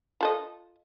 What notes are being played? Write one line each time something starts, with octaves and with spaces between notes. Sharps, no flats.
F4 A4 D#5